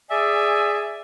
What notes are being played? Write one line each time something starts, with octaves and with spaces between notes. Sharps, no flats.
G#4 D5 E5 G#5